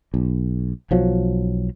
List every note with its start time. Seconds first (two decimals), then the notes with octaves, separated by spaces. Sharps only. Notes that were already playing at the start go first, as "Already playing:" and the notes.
0.14 B1
0.91 B1 F3 F#3